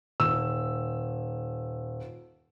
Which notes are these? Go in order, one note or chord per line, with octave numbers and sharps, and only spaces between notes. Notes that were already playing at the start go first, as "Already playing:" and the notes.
D#1 E6